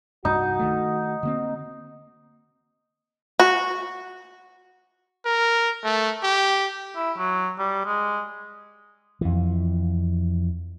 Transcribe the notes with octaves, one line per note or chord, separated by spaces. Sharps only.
C2 G2 D#4 F#4
D#3 A3
D3 A#3 C4
F#4
A#4
A3
G4
E4
F#3
G3
G#3
F2 E3